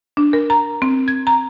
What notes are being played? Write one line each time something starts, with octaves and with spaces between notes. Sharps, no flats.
D4
A#4
A#5
C4
G#6
A#5